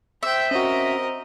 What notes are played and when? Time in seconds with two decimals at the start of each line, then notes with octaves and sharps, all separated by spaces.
0.23 C5 E5 G5
0.51 C4 C#4 F#4 A#4 D#5